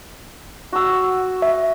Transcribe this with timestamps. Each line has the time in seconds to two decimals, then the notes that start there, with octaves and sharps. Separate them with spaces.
0.73 F#4 E6
1.42 E5